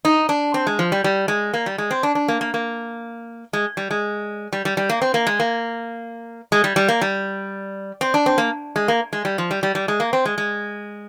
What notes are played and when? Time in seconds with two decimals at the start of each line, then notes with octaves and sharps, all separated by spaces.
0.05 D#4
0.29 D4
0.54 C4
0.67 G#3
0.79 F3
0.92 G3
1.04 G3
1.28 G#3
1.54 A#3
1.66 G3
1.78 G#3
1.91 C4
2.03 D4
2.15 D4
2.28 A#3
2.41 A#3
2.54 A#3
3.53 G#3
3.77 G3
3.91 G#3
4.53 G3
4.65 G3
4.77 G3
4.89 A#3
5.02 C4
5.14 A#3
5.27 G#3
5.40 A#3
6.52 G#3
6.64 G3
6.76 G3
6.88 A#3
7.01 G3
8.01 C4
8.14 D4
8.26 C4
8.38 A#3
8.76 G#3
8.88 A#3
9.13 G#3
9.25 G3
9.38 F3
9.51 G3
9.63 G3
9.75 G3
9.88 G#3
10.00 A#3
10.13 C4
10.25 G#3
10.38 G#3